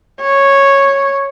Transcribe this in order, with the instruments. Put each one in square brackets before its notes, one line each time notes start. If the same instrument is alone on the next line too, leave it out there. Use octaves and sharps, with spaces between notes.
[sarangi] C#5